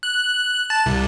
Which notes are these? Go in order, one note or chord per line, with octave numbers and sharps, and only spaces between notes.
F#6
A5
C2